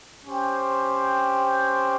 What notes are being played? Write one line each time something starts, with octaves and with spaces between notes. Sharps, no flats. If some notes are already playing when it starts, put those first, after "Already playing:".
C#4 G4 C5 G5